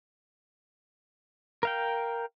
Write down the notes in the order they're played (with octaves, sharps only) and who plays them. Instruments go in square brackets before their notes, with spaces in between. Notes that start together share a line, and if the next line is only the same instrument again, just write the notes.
[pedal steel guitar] A#4 F5 G5